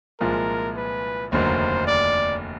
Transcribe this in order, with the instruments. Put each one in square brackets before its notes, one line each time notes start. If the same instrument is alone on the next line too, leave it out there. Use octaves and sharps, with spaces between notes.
[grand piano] C2 A#2 F3 G#3 [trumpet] A#4
[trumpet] B4
[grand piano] F1 D#2 D3 F#3 A#3 [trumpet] C5
[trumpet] D5